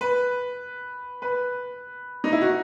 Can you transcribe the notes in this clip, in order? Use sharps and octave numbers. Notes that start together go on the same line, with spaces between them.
B4
B4
D#4
E4
F#4